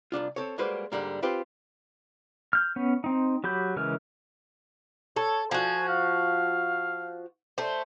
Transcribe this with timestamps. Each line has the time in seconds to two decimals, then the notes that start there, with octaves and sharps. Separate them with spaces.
0.12 C2 B2 D4 F4
0.36 C4 A4 C#5
0.58 G3 G#3 A#3 F#4 B4 C5
0.92 G#2 B2 D3 G3 A#3
1.22 C4 F4 G4 B4 C5
2.53 F6 G6
2.76 B3 C#4
3.04 C4 D#4
3.44 F#3 G4 B5 G6
3.76 C#3 E3 G#3 A#4 F6
5.16 A4 C#5
5.51 F3 F#4 G#5
5.88 F5
7.58 A3 C5